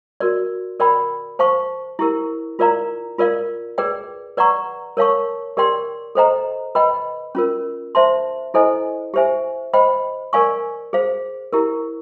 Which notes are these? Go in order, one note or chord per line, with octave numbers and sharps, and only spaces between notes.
F#4 A#4 D5
A#4 D5 G5 B5
C5 F5 A5 C#6
E4 G4 A#4
F4 A#4 D5 F5 A#5
F4 A#4 D5 F5
G#4 B4 D5 G5
B4 D5 F#5 A#5 C#6
A#4 C#5 F5 A5 C#6
G4 A#4 D5 G5 C6
A4 C5 D#5 G5 A#5
B4 D#5 G5 B5
C#4 F4 A#4
C5 E5 A5 C6
E4 A4 C5 D#5 G#5
G4 C5 E5 G#5
C5 D#5 G5 B5
A#4 D5 F5 G#5 C#6
G#4 C5 F5
E4 G4 A#4